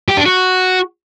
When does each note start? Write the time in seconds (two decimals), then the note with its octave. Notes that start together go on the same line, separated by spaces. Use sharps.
0.09 G4
0.17 D4
0.26 F#4